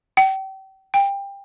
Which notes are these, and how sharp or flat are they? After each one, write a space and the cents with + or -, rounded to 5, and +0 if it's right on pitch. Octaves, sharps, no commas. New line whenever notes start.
G5 -35
G5 +20